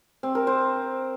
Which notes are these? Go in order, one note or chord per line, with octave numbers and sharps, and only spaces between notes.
C4
A#4
C5